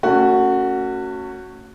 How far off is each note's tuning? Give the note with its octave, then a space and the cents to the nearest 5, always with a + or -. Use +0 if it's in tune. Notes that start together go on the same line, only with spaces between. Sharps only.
A3 +40 C#4 +0 F#4 +0